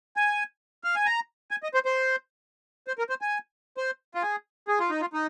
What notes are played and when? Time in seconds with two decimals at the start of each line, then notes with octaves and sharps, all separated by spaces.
0.16 G#5
0.84 F5
0.96 G#5
1.06 A#5
1.51 G#5
1.63 D#5
1.74 C5
1.85 C5
2.87 C5
2.98 A#4
3.09 C5
3.21 G#5
3.77 C5
4.15 F4
4.23 G#4
4.68 G#4
4.79 F4
4.90 D#4
5.01 F4
5.13 D#4